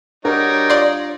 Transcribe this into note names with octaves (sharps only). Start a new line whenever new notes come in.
G3 D4 D#4 F#4 A#4 C#5
F4 D5 C6